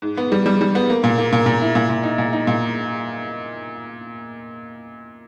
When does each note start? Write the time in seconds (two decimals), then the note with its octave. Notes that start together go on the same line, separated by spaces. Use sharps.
0.02 G#2
0.17 B3
0.32 G3
0.46 G3
0.61 G3
0.75 B3
0.90 A#3
1.04 A#2
1.18 A#3
1.32 A#2
1.46 A#2
1.61 E4
1.75 A#2
1.89 A#2
2.03 D#4
2.18 A#2
2.33 D#4
2.47 A#2